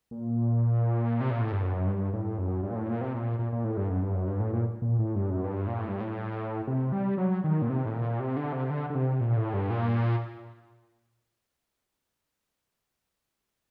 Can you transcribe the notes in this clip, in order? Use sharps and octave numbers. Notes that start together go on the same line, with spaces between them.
A#2
C3
A#2
A2
G2
F#2
G2
A2
F#2
G2
A#2
A2
A#2
C3
A#2
A#2
A#2
A2
G2
F#2
G2
F#2
G2
A2
A#2
A#2
A2
G2
F#2
G2
A#2
A2
G2
A2
C3
G3
F#3
D#3
A#2
C3
A2
A#2
C3
D3
C3
D3
D3
C3
A#2
A2
G2
A#2